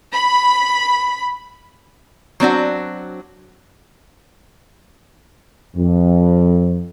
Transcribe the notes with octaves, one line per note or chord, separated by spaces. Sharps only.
B5
F#3 C4 D4 F#4
F2